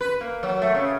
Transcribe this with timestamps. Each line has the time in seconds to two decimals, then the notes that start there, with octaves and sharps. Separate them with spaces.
0.01 B4
0.21 A#3
0.43 F#3
0.62 A3
0.75 C#3